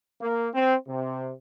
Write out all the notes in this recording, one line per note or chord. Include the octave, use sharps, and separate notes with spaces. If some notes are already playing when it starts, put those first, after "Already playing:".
A#3
C4
C3